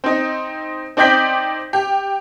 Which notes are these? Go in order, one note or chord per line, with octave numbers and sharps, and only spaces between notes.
C4 D#4
C4 D#4 D5 G5 G6 B6
G4